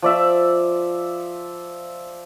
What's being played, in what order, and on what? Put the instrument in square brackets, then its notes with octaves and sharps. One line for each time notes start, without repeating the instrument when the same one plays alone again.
[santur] F3 D5 E5